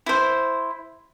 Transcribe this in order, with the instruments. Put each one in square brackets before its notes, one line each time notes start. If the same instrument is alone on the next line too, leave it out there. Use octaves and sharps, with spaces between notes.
[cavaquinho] E4 C5